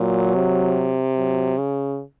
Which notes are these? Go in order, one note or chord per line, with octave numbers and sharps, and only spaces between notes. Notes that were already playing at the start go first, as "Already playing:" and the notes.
Already playing: A#2 F#3
C3
F#3
C#3